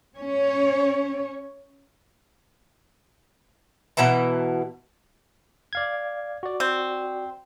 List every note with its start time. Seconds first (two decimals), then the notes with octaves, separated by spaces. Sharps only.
0.16 C#4 C#5
3.97 B2 E3 A5 A#5
5.73 D5 F5 G#6
6.43 F#4 D5
6.60 C4